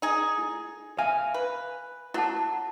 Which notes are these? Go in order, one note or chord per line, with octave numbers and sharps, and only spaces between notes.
D#4 G#4
E4
E5 F5 G#5
B4
F#3 E4 F#5 A5